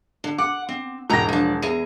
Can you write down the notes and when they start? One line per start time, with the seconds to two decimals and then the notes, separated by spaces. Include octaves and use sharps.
0.24 D3
0.38 F#5 D6
0.69 C4
1.10 E1 G#2 G5 A#5 A#6
1.29 F3 D4
1.62 E2 G#4